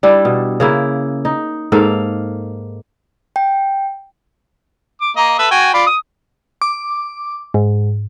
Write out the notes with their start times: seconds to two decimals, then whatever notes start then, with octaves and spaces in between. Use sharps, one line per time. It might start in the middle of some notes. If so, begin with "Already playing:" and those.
0.03 G3 D4 E4
0.25 B2
0.60 C#3 A#3 E4
1.25 D#4
1.72 G#2 A#3 A4 F5
3.36 G5
5.01 D6
5.17 A#3 D#5 A#5
5.39 A4 B4 E5
5.51 F#4 G5 G#5
5.74 F4 D5 B5
5.87 D#6
6.62 D6
7.54 G#2